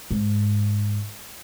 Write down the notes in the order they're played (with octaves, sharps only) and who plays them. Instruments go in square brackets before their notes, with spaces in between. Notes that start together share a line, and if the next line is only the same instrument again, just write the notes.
[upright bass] G#2